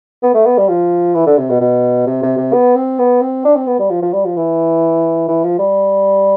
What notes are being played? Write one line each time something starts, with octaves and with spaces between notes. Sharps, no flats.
B3
A3
B3
G3
F3
E3
D3
C3
B2
B2
C3
C3
C3
B3
C4
B3
C4
D4
C4
B3
G3
F3
F3
G3
F3
E3
E3
F3
G3